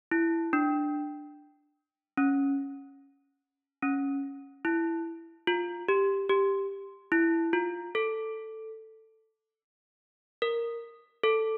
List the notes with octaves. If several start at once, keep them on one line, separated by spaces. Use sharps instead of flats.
E4
D4
C#4
C#4
E4
F4
G4
G4
E4
F4
A4
A#4
A4